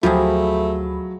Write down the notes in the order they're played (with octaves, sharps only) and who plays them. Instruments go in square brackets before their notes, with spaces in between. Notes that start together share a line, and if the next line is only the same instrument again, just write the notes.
[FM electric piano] D2 B5 [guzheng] F3 G4 G#4 [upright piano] F#3 [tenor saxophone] A3